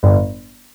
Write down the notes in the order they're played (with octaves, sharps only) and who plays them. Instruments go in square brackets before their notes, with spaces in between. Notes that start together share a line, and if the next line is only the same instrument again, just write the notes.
[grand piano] G1